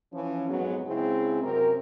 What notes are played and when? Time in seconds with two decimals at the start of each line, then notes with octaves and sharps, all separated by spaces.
0.13 E3 F3 C#4
0.49 F2 G#2 F#3 B3
0.87 C#3 G#3 C4 E4
1.42 F#2 C3 C4 A#4